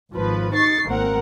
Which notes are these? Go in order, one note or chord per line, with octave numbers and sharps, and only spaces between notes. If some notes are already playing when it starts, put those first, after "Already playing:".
G#1 F3 B4
D#4 C#6 A6 C7
G#1 A#3 C4 A#4 F#5